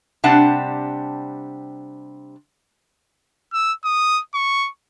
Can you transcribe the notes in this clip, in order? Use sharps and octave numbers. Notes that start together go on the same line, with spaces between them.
C3 G3 D4 F#5 A5
E6
D#6
C#6